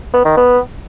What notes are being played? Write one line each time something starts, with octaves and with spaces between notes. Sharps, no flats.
B3
D#3
B3